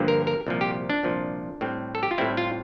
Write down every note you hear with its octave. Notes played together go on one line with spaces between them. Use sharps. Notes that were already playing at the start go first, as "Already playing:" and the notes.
Already playing: G2 D3 F3 A#3
A#4
A#4
C2 A#2 F3
G4
D4
C2 A#2 F3
A2 G3 C4
A4
G4
F4
A2 G3 C4 E4
F4